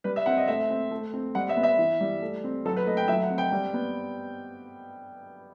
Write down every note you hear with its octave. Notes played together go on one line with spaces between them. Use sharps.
G3 B4
E5
C4 F#5
D#5
A3 E5
C4
A3
C4
G3 F#5
E5
B3
E5
E3
G3
A3
C4
F#3 A4
B4
A3 D#5
G5
F#3 E5
F#5
C4
G5
G3
B3